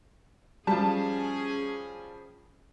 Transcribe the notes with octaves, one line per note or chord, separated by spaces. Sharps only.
F3 G3 C#4 G#4 A5